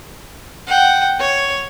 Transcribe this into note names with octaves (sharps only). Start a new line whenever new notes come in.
F#5 G5
C#5